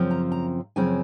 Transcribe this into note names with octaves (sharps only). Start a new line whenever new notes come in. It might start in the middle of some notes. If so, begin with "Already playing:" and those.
Already playing: F#2 C#3 F3 C4
A#5
A#5
F#2 C#3 F3 C4 G#5